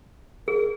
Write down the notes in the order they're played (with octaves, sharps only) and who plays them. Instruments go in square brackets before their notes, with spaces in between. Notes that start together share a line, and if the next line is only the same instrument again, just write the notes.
[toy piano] G#4 [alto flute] A#4